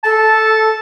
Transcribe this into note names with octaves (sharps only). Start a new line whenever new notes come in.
A4 A5